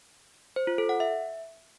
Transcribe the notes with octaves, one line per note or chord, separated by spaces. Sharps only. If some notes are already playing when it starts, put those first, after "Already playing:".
C5
F4
A4
F#5
E5